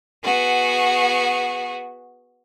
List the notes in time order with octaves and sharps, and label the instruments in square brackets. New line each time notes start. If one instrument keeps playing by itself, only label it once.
[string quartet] B3 F#4 G#4